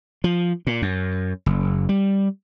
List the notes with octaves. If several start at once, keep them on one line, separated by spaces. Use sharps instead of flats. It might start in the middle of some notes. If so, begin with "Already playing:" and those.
F3
A#2
F#2
F#1
G3